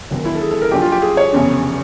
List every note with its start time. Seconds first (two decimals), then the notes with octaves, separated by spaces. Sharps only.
0.11 E1 D#2 D#3 F#3
0.25 E4
0.35 A4
0.41 G#4
0.51 A4
0.62 A#4
0.71 A#1 A#2 F#3 G4
0.82 F4
0.92 G4
1.02 G#4
1.17 C#5
1.32 F1 E2 C#3